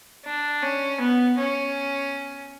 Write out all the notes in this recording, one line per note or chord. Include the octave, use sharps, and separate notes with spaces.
D4
C#4
B3
C#4